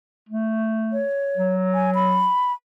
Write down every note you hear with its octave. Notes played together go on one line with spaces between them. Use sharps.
A3
C#5
F#3
G#5
B5